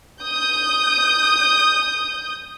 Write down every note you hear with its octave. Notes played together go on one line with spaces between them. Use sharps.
D#6 G6